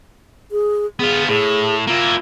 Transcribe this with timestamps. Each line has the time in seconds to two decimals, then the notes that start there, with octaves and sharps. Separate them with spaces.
0.52 G#4
0.99 B3 F4 G#4
1.28 A2 G#4
1.87 A#3 E4 F4